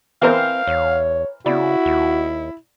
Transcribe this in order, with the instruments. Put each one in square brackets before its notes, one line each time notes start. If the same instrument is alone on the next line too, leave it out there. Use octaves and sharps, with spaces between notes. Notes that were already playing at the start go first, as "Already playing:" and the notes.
[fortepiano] E3 A#4 C5 [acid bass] C4 [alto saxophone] F5
[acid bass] E2 [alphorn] C#5
[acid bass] C#3 [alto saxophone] E4 [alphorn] F#4 [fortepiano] D5 B5
[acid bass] D#2